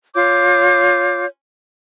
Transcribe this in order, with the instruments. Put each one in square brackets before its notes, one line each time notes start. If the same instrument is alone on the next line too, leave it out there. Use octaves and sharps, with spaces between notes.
[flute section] F4 C#5 D6 G6